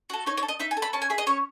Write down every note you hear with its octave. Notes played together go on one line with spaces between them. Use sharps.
F#4 A4
D#4 C#5
C#5
A4
D#5
D#4 E5
G#5
A4
B5
C#4 A5
G#5
G#4 E5
D#5
C#4 C#5